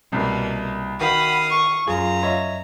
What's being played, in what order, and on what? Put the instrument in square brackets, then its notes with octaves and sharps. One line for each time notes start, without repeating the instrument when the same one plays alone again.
[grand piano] C2 [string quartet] B2 A#3
[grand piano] D#3 [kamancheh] F#4 B5 [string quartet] F5 D#6
[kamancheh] C#6
[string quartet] F#2 A#5 [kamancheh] F4 [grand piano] G#4
[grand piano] C#5 D#5 E5